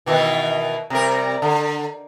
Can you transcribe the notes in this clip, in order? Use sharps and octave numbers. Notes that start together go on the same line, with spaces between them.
B2 D#3 E3
C3 G3 A#4
D3